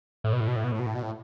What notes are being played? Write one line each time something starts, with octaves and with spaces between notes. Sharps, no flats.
A2
B2
A2
B2
A2
B2
A2
B2
A2
B2
A2